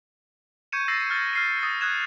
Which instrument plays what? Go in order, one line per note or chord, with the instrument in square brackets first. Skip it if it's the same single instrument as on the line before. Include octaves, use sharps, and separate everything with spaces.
[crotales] C#6 G6 G#6 C#7 D#7 E7
E6 A6 A#6 C7
F6 A6 D#7
F6 C7 D#7
D#6 A6
D#6 F#6 G#6 E7